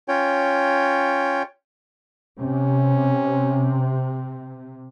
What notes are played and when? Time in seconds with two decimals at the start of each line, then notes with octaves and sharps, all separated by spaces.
0.08 C#4 F4 C#5 G5
2.39 C3 C#4